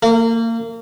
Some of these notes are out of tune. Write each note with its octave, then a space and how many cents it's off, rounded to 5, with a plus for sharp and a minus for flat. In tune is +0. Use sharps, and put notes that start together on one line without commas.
A#3 -30